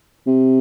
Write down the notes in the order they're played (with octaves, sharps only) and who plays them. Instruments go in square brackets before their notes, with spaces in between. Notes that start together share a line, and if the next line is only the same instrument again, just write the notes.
[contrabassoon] C3